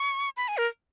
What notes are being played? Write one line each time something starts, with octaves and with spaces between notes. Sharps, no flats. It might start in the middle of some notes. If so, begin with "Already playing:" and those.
Already playing: C#6
B5
G#5
A#4